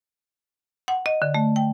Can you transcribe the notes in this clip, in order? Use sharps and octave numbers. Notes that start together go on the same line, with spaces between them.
F#5
D#5
D3
A3
G5